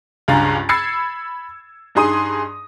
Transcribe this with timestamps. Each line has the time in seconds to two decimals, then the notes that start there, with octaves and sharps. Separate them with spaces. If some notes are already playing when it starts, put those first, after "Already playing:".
0.28 C#2 G2 F5 G#5 A#5 A6
0.69 B5 E6 G#6 A6 C7 C#7
1.95 G2 D#4 G#4 C6 D#6 D#7